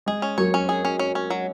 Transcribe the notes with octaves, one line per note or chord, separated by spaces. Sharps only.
G#3 G#4
C#4
F#3 A#3 C#5
C#4
G#4
C#4
C#4
C#4
F#3